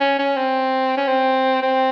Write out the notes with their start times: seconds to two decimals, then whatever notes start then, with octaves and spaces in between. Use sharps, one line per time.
0.01 C#4
0.19 C#4
0.37 C4
0.97 C#4
1.08 C4
1.62 C4